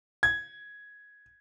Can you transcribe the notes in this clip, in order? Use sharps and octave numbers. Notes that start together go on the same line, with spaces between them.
G#6